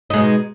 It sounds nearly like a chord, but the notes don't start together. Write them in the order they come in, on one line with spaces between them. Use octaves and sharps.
D#4 G#3 B2